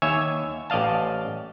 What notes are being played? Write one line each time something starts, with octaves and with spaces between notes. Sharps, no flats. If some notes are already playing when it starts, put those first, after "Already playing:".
D#2 C#5 E5 G#5
A1 D5 D#5 F5 A5